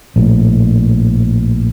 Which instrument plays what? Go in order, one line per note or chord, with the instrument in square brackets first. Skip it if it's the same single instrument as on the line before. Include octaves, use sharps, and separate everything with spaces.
[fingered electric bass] A#1 A2